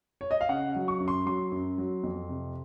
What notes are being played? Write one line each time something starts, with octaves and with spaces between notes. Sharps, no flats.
C#5
D#5
F5
C#3 F#5
F#3
C#6
F#2
C6
F#3 C6
F#2
F#3
F2
C3